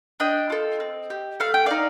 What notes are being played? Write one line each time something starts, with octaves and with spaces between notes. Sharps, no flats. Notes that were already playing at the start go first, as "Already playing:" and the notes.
D4 D#5 G5
F4 A4
C4
G4
A3 F5
G5
D#4 D5 F5